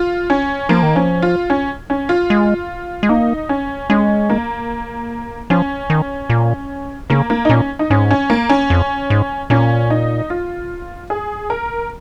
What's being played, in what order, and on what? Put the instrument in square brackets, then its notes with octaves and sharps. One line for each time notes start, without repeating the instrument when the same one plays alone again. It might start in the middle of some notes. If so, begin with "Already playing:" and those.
Already playing: [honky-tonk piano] F4
C#4
[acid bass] F3 [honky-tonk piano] A#3
[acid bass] D#3
[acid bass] F3 [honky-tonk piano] C#4
[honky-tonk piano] F4
C#4
C#4
F4
[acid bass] G#3
G#3
[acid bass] A#3 [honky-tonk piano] D#4
[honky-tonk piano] C#4
[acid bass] G#3 [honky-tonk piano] C#4
[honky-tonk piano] A#3
[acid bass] F3 [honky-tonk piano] C#4
[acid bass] D#3
A#2
[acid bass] C#3 [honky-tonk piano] A#3
[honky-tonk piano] A#3
D#4
[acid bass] A#2 [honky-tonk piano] C#4
[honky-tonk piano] D#4
[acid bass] G#2 [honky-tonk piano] C#4
[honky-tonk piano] C#4
A#3
C#4
[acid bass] F2
G#2
[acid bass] A#2 [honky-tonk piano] C#4
[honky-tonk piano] D#4
F4
G#4
A#4